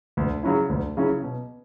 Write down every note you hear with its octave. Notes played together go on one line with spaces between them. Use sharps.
D2
C#3 F#3 C#4 E4
D2
C#3 F#3 C#4 E4
B2